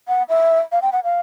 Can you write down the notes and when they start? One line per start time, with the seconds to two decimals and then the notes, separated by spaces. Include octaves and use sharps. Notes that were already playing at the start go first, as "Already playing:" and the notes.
0.08 F#5
0.29 E5
0.72 F5
0.82 G5
0.93 F#5
1.04 F5